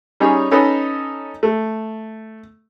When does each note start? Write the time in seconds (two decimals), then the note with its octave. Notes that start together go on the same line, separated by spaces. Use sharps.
0.20 G3 C#4 D#4 G#4 C#5
0.51 C#4 D#4 A4 B4 D#5
1.43 A3